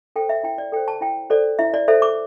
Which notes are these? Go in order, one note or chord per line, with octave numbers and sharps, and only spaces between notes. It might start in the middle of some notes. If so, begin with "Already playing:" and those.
A4 C5 G5
E5
E4 G5
D5
A4 C5 G5
A5
E4 G5
A4 C5 D5
E4 E5
D5
A4 C5 E5
D6